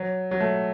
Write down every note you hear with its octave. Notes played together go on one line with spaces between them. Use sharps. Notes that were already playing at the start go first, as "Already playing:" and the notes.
Already playing: F#3
F#3
A3